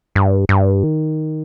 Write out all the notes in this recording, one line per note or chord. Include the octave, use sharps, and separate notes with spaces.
G2
G2
D#3